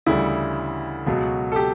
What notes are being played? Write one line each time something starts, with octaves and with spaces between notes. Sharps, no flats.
D2 C#3 E3 G3 E4
C#2 B2 F#3
A4
G4